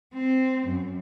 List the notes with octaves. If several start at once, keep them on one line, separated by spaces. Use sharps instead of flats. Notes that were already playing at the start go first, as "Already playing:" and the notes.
C4
F#2